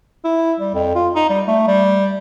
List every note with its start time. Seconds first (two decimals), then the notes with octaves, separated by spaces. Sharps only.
0.24 E4
0.60 G3
0.74 F2
0.95 F4
1.15 D#4
1.30 G3
1.47 A3
1.67 G3